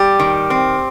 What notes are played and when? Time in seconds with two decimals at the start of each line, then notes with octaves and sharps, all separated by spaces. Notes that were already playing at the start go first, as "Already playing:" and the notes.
Already playing: G3 G4
0.20 D#3
0.50 C4